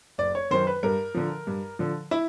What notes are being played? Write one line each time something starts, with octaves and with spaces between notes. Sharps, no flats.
F#1 D5
C#5
F#2 D#3 C5
B4
G2 A#4
D3 F3
G2
D3 F3
E4